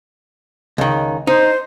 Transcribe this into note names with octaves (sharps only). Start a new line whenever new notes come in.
C#2 D#3
D#4 C5